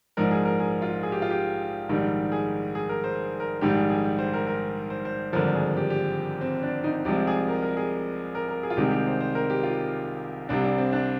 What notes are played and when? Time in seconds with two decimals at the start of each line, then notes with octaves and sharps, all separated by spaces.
0.17 A#1 G#2 F3 G#3 A#4
0.31 G#4
0.45 A#4
0.60 G#4
0.82 F4
1.03 G#4
1.12 G4
1.22 F4
1.30 G4
1.89 A#1 G#2 D#3 G3
2.32 G#4
2.75 G#4
2.89 A#4
3.04 C5
3.40 A#4
3.61 A#1 G#2 D#3 G3 G4
3.76 G#4
3.90 G#4
4.19 C5
4.34 A#4
4.47 A#4
4.90 C5
5.05 C5
5.33 G#1 G2 D3 F3 A#4
5.55 G#4
5.77 G4
5.90 G4
6.41 C4
6.63 D4
6.84 D#4
7.05 C2 C3 F3 G#3 G4
7.27 G#4
7.48 A#4
7.62 A#4
7.77 G#4
8.35 A#4
8.49 A#4
8.63 G#4
8.70 F4
8.77 C2 C3 D#3 G#3 G4
8.92 G4
9.07 C5
9.20 C5
9.35 A#4
9.50 G4
9.63 F4
10.49 C2 C3 G3 D4
10.64 D4
10.78 C4
10.93 D4